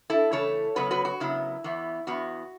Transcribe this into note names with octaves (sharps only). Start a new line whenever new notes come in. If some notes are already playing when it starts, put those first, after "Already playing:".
E4 A4
C#3 E3 A3 A4 C#5
F#2 C#3 F#3 B3 F#4 B4
F#4 B4
F#4
F#2 C#3 F#3 B3 E4
E2 E3 B3
E2 E3 B3 F#4